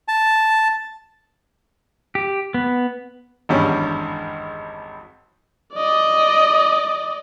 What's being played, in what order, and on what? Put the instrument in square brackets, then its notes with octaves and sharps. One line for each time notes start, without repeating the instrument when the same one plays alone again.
[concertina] A5
[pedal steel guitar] G4
B3
[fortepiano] G#1 E2 G2 C#4
[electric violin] D5 D#5